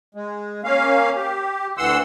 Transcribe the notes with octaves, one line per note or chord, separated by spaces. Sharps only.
G#3
A#3 C#4 F5
G4
D2 E3 F#5 C6 E6